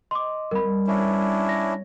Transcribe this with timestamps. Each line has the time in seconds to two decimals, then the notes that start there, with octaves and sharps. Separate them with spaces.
0.11 D#5 C6 D6
0.51 G3 C4 A#4 B5
0.87 C#4 D4 E4 C5 C#5 E5
1.49 C#5 A#6